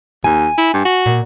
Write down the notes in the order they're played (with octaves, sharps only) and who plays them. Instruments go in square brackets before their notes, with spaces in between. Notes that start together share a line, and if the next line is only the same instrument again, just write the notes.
[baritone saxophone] D#2 [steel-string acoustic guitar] G#5
[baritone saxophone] E4
G2
F#4
[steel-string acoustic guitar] A#2